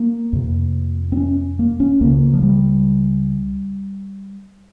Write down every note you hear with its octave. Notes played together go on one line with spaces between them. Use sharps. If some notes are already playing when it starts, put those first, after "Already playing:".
Already playing: A#3
F2 C3
C4
C#4
A#3
C#4
C#2 C#3 A#3
F3
G3